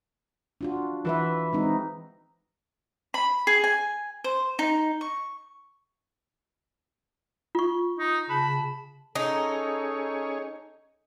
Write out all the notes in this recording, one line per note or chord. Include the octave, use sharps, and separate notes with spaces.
D4 F4 F#4
E3 F#4 B4 E5
G#3 C4 D#4
B5
G#4
G#5
C5
D#4
C#6
F4 C#6
D#4
C#3 A5 B5
C#4 D#4 G#4 A4 C#5